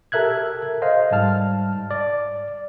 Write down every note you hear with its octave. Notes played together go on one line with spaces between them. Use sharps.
G4 A4 A#4 E5 F#6 G#6
C5 D#5 F5
G#2 G3 A5 F6
D5